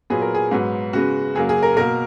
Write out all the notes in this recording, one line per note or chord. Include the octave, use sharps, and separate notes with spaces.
A#2 F#3 B3 G#4
A#4
G#4
G#2 F#3 B3
C#3 G#3 B3 F#4
F#2 C#3 F#3 A#3 G#4
G#4
A#4
B2 A#3 A#4